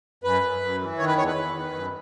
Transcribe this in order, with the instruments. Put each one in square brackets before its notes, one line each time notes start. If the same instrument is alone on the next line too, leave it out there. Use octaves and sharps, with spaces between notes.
[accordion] F#2 B4
F#2
F#2
E3
D#3 C#5
B4
E2 C#5
B4
E2
D#3
F#2